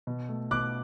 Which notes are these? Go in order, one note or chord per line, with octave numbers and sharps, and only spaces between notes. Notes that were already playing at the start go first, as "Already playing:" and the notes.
B2
A3
B2 D6 F#6